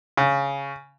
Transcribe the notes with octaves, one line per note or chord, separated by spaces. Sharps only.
C#3